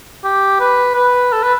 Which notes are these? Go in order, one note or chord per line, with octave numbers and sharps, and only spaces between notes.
G4
B4
B4
A4
B4